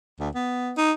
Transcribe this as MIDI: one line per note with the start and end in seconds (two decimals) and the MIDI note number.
0.20 0.29 38
0.35 0.72 59
0.77 0.92 63